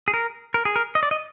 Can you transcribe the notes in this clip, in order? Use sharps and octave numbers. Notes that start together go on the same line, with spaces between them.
G#4
A#4
A#4
G#4
A#4
D#5
D5
D#5